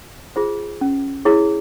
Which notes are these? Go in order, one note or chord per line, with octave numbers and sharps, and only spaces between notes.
F4 G#4 C5
C#4
E4 G#4 C#5